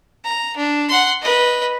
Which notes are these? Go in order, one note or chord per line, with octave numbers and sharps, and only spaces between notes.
A#5
D4
F#5 C6
B4 D#5